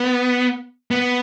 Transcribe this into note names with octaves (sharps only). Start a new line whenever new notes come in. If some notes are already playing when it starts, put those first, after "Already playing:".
Already playing: B3
B3